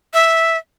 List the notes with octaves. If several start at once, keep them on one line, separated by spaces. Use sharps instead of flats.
E5